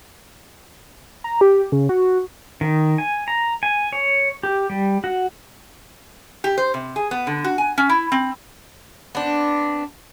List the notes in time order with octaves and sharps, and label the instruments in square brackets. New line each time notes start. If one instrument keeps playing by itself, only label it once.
[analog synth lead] A#5
G4
C#3
F#4
[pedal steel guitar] D#3
G#5
A#5
G#5
C#5
G4
G3
F#4
[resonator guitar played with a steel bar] G4
C5
C3
G#4
B3
D3
F#4
G#5
C#4
E4
C4
[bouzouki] B3 C4 D4